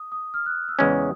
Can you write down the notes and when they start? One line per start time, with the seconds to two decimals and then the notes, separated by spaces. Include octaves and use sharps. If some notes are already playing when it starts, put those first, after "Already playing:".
Already playing: D#6
0.12 D#6
0.34 F6
0.46 F#6
0.68 E6
0.79 E2 C#3 E3 G#3 C#4 D#6